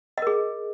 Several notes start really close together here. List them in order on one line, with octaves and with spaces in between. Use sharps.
D#5 A#4 G#4